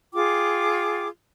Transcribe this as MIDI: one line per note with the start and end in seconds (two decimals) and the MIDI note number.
0.14 1.06 65
0.14 1.06 68
0.14 1.06 79
0.14 1.06 86